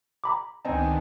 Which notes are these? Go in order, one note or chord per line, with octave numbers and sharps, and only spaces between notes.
A#5 B5 D6
C#2 D#3 B3 C4 D4 D#4 G#5 A5